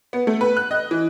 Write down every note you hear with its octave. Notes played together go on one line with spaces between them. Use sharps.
B3
A3
B4
F#6
D#5
E3